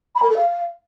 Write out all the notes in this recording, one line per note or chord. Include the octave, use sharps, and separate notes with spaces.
B5
A#4
A4
F5